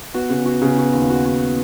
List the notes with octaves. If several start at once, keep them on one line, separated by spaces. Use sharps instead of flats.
B3 F#4
C#3
F#4
C#3
F#4
D#2
F#4
F#4